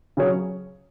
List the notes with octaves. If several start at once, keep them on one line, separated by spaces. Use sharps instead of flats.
C#3 F#3 C#4 G#4 C#5